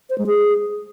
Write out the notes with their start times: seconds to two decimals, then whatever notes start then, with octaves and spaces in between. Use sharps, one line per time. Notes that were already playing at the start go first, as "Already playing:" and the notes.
0.10 C5
0.18 G#3
0.27 G#4